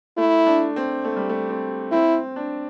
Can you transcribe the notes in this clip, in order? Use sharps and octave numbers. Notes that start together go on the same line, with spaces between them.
A3 E4
D4
C4
A3
G3
A3
C4
C4 E4
D4